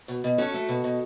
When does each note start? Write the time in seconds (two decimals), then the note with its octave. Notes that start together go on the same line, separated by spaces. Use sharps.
0.08 B2
0.24 B2
0.38 C#4 F#4 A4
0.54 A3
0.69 B2
0.84 B2